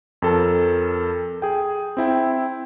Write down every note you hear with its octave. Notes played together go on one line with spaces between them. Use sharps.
F2 A4 A#4
G#4 G5
C4 E4 G5